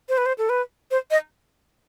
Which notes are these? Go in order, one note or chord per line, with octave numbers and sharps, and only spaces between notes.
C5
B4
C5
A4
B4
C5
D#5